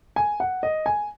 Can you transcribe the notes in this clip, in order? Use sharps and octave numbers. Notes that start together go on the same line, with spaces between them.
G#5
F#5
D#5
G#5